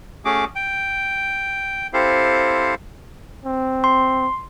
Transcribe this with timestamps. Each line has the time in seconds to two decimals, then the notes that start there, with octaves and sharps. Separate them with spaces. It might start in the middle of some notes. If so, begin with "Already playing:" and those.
0.25 A3 C#4 F#4 G#4 D6
0.55 G5
1.93 C4 E4 G4 A4 C5 F5
3.45 C4
3.84 C6